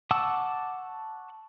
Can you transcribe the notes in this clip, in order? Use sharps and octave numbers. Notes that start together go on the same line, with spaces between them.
F#5 A5 C#6 D6 E6